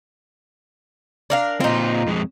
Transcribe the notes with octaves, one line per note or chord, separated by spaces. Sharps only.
D4 A#4 F5
A#2 C4 D#4 F4
F2 G#3